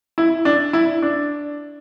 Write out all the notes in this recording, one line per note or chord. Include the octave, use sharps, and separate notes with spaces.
E4
D4
E4
D4